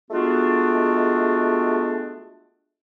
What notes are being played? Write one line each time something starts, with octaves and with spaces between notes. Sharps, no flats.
G#3 A3 B3 D4 F4 F#4